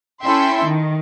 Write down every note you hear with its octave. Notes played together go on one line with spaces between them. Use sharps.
C#4 E4 A4 E5 G5 C6
D#3